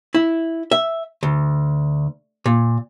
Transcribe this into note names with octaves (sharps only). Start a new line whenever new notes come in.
E4
E5
D2
A#2